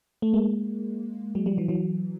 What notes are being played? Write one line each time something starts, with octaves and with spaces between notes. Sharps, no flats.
A3
G#3 A#3
F#3 G#3
F3 G3
E3 F#3
E3 F#3